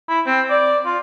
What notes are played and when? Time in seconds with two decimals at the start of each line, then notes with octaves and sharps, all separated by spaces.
0.09 E4
0.26 C4
0.50 D5
0.85 F4